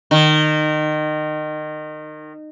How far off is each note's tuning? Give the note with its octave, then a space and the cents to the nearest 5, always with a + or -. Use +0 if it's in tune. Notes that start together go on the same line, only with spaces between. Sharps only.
D#3 -25